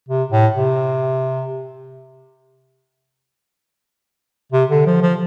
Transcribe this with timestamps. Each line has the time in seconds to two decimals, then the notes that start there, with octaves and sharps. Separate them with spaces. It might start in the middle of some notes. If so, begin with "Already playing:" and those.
0.09 C3
0.32 A2
0.53 C3
4.52 C3
4.70 D3
4.86 F3
5.02 F3